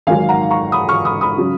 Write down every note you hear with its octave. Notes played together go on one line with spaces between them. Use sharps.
G#1 G#2 D#3 F#3 F5 G#5
F#5 A#5
A#5 C#6
B5 D#6
C#6 F6
B5 D#6
B5 D#6
C#3 F#3